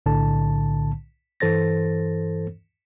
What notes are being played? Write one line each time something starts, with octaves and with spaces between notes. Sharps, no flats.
B1 A2 D3 A5
G2 E3 A4 C5 A6 A#6